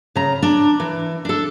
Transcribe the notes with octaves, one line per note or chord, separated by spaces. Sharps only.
C#3 A#5
D4
E3
D4 A4